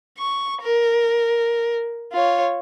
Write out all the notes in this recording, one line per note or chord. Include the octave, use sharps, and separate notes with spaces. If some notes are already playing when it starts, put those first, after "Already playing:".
C#6
A#4
F4 C#5